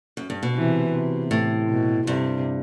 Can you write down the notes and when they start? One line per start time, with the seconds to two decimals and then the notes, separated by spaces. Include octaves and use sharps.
0.17 F#2
0.30 G2
0.43 B2
0.55 C3 E3
0.94 C3
1.31 A2
1.69 B2
2.07 G2 C3